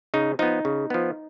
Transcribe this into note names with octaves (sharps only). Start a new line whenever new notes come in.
C#3 D#4
F3 B3 D#4
C#3
F3 B3